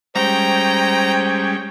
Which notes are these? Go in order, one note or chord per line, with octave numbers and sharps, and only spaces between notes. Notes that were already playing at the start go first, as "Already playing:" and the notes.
G3 G#3 C#4 C5 G5 A#5